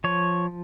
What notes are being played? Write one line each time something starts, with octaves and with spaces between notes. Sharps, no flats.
F3 C#5